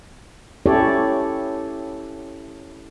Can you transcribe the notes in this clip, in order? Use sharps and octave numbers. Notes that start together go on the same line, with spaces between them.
C#4 E4 G4 A4 C#5 D5